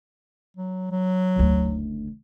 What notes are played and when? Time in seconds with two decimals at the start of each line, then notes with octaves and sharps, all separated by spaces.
0.57 F#3
0.91 F#3
1.36 F#1 D2